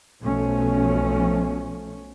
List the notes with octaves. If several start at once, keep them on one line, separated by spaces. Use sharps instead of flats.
B1 B2 F3 A3 C#4